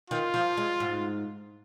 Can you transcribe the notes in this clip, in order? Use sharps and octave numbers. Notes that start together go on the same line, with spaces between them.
D#3 F4
F3
G#3
G#2